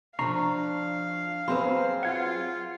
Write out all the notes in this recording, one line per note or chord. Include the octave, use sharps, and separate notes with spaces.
F3 D4 F5 A#5 C#6 C7
F#3 C4 F#4 G#4 B4 C5 B5 C6
F4 F#5 G#6